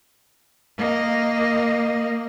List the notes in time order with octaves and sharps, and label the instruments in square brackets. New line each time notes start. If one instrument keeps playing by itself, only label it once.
[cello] A#3 D#5